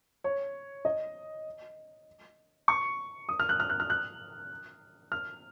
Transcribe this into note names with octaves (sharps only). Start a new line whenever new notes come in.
C#5
D#5
C#6
D#6
F6
F#6
F6
F#6
F6
F#6
F6